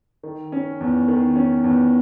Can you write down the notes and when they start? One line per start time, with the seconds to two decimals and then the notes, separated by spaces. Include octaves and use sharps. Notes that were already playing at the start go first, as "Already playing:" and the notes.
0.23 D#3
0.52 C#4
0.81 E2
1.08 D#3
1.36 C#4
1.64 E2